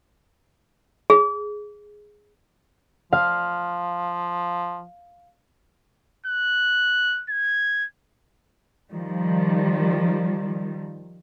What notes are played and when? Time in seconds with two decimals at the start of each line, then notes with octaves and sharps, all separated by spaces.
1.10 G#4
3.13 F3 F5
6.26 F#6
7.29 G#6
8.93 D#3 F3 G3